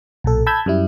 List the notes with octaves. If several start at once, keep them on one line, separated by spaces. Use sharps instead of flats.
B1 A#2 A4
A5 B5 E6 G6 G#6
F#2 G3 E4